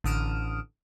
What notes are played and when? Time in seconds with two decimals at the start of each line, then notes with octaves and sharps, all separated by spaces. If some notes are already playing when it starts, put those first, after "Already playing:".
0.04 A1 D3 D#6 F6 D7 E7